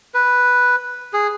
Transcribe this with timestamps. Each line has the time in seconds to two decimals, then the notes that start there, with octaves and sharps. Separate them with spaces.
0.14 B4
1.13 G#4